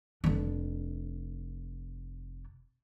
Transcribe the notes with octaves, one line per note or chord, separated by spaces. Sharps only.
F1 D4